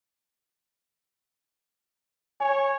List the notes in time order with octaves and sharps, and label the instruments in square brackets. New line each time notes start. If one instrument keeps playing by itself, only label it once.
[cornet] C#5 [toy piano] G#5